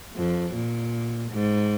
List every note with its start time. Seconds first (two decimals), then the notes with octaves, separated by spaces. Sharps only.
0.16 F2
0.55 A#2
1.32 G#2